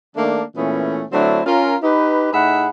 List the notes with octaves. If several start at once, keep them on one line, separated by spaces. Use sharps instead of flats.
D#3 A3 A#3 D4
A#2 E3 A3 B3 C#4
D3 F#3 A3 C4 D4 E4
C#4 F4 A#4
D#4 G4 B4
A2 D#4 G#4 E5 F#5 B5